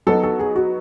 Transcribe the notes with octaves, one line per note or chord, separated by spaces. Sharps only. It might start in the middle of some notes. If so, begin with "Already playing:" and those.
F#3 B3 D#4 A4
A4
G#4
F#4